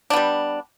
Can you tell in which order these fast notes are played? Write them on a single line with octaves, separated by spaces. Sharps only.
D4 B3 G3